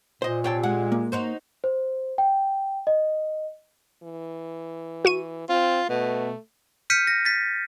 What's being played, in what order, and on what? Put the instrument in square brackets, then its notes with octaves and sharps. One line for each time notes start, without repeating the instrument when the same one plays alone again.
[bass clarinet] A#2 [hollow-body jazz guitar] C5 D#5
[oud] C3 [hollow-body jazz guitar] C#5 G5 A5
[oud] G#3 [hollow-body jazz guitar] F#5
[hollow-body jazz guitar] A#3
[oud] D#4 F#4 C5
[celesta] C5
G5
D#5
[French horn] E3
[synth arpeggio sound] F#4 C#6 D#7
[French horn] C4 [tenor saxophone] F4
[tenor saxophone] B2 [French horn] A3
[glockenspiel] F6 G6 B6 C#7 D#7
A#6
A6 B6